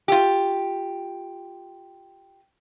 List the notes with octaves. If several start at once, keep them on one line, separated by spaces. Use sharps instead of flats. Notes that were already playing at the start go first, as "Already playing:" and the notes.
F4 G4